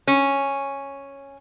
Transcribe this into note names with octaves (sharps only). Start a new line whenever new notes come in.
C#4